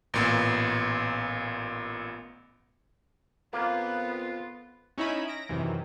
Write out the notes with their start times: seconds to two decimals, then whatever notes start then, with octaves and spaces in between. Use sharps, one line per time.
0.14 A1 A#2 B3
3.53 F2 A#3 B3 F4
4.98 C#4 D#4 E4 C#5 E5 B5
5.28 A#6 D7
5.49 F#2 C3 D#3 E3